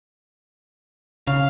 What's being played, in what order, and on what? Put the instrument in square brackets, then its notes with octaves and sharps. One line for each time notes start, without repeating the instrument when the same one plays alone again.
[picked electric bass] C#3 [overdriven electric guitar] F5